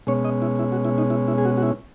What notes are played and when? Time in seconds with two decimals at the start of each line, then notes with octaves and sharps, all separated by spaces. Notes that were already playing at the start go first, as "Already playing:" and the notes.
0.07 B2 G#3 C#4 C#5
0.25 D#5
0.42 E4
0.59 E4
0.72 F#4
0.85 E4
0.98 D#4
1.10 E4
1.28 E4
1.38 G#4
1.45 F#4
1.57 F#4
1.63 E4